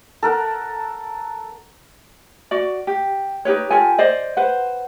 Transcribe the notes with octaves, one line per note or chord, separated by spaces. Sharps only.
A4 A#4 F#5
F#4 D5
G4
D#4 G4 B4 C#5
F4 G4 A4 G#5
C5 D5 D#5
B4 C5 F#5